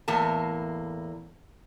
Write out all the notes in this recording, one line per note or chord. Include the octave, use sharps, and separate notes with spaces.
E2 A2 A#3 A5